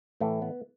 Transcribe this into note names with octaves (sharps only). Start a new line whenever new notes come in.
A2 E3 A3
B3